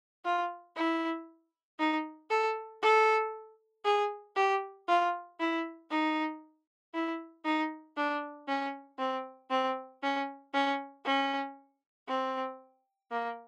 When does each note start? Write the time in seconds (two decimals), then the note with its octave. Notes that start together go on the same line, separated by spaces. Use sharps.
0.25 F4
0.76 E4
1.79 D#4
2.30 A4
2.82 A4
3.85 G#4
4.36 G4
4.88 F4
5.40 E4
5.91 D#4
6.94 E4
7.45 D#4
7.97 D4
8.48 C#4
8.99 C4
9.51 C4
10.03 C#4
10.54 C#4
11.05 C#4
12.08 C4
13.11 A#3